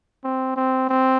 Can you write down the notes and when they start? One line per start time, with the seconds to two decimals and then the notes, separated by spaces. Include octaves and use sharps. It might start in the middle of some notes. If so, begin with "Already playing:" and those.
0.24 C4
0.56 C4
0.89 C4